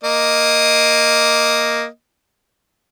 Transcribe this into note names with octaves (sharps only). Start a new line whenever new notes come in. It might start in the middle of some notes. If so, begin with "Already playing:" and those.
A#3 D#5